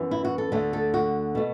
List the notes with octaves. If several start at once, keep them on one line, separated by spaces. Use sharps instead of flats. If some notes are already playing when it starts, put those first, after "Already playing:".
Already playing: F#2 E3 B3
E4
F#4
A4
D2 D3 A3
A4
F#4
B2 A3